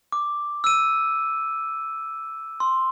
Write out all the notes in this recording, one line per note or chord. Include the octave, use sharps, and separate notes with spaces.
D6
E6 D#7
C6